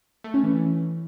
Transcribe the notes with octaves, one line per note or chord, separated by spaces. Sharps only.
A3
C#4
E3